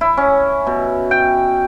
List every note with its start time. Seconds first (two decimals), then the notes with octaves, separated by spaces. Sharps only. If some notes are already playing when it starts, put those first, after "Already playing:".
0.01 E4
0.17 C#4
0.67 B2
1.11 G5